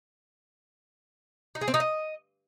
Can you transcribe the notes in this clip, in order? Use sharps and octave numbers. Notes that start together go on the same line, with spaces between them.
D#4
G#4
C4
D#4
D#5